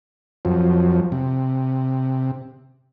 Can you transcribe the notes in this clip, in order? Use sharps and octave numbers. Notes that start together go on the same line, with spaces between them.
F2 F3 F#3
C3